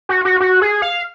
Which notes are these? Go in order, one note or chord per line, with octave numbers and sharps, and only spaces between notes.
F#4
F#4
F#4
G#4
F5